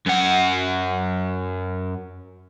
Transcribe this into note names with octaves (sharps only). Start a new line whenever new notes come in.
F#2 F#5